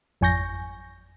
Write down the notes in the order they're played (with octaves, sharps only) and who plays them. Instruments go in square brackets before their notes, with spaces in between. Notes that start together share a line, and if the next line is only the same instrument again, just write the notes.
[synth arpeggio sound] G#1 F2 G#5 C#6 G6 A#6